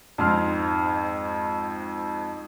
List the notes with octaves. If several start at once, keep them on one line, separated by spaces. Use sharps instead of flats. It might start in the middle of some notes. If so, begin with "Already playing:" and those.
F2 G#2 C6 F6